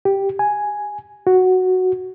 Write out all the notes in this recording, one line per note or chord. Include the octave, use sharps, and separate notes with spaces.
G4
G#5
F#4